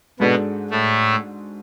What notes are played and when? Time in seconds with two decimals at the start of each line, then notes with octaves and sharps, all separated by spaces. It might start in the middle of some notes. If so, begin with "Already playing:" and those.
0.20 G#2 B2 G#3 B3 D4 F#4 A4
0.70 A2 A3